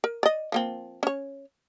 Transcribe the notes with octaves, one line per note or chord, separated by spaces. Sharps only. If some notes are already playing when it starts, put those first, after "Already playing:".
A#4
D5 D#5
F3 A#3 C4
C#4 C#5